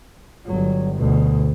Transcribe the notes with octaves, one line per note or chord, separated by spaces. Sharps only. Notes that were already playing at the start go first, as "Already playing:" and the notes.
G1 F#3
D2 B2